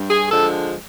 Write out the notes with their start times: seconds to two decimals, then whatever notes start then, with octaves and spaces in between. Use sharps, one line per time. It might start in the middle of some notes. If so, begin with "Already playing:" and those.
Already playing: G2
0.09 G#4
0.31 D3 F3 G#3 A4